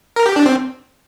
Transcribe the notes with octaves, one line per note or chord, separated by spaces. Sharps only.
A#4
G4
D4
C4